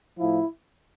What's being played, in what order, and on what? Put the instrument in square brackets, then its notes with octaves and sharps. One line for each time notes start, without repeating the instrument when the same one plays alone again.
[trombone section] A2 F3 E4